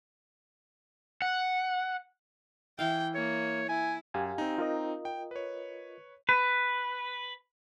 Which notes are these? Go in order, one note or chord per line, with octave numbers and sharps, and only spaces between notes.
F#5
E3 E4 F5 G5
A#3 C#5
E4 G#5
F#2 G4 F5 G#5
C4 D#4
F4 A#4 D#5
G5
B4 C#5
B4